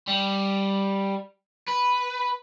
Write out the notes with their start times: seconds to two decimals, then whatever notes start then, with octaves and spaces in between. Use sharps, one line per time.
0.08 G3
1.68 B4